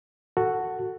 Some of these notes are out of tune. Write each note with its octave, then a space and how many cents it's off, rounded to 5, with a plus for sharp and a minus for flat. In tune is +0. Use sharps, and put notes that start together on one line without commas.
F#4 +0 A4 +15